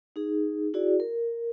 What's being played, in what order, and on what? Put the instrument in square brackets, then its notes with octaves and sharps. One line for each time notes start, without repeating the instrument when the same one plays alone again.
[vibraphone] D#4 G#4
E4 F#4 G#4 D5
A#4